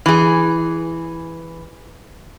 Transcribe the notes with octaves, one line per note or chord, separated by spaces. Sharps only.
E3 G#4